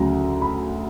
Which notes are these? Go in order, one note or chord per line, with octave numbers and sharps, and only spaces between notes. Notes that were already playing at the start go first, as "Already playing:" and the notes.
Already playing: D2 C#3 F#3 A#5
B5